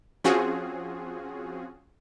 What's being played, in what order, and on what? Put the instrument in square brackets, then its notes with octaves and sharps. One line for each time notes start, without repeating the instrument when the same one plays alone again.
[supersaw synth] F3 C4 C#4 F4 F#4 G#4